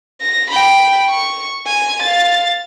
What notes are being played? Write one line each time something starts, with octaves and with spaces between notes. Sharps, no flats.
A#6
G5 B5
C#6
G#5
F5 A6